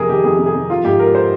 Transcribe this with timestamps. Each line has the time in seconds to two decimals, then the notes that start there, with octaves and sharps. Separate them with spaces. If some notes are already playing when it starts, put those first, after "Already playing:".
Already playing: F2 C3 G#4 A#4
0.09 D#3 G4
0.24 F2 G#4
0.39 C3
0.46 G#4
0.55 F2
0.70 F3 F4
0.84 G#2 G4
1.00 G#3 A#4
1.15 C5